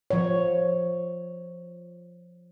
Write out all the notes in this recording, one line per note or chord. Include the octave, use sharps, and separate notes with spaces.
F3 C#5